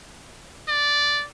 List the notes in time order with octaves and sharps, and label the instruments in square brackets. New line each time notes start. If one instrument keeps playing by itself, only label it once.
[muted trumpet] D5